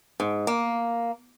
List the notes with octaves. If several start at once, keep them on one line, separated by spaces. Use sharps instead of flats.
G#2
A#3